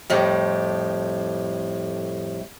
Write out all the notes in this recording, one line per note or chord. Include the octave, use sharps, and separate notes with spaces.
F2 A2 G3